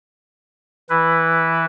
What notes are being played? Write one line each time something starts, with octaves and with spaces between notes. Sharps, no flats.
E3 E4 B4